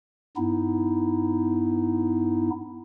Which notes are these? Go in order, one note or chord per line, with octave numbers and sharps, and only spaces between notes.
G2 B3 D#4 E4